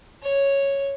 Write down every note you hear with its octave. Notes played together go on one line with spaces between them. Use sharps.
C#5